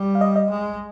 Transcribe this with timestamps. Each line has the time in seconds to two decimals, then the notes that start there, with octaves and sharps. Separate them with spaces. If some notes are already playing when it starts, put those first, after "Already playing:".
Already playing: G3
0.15 F5
0.21 D#5
0.36 D#5
0.50 G#3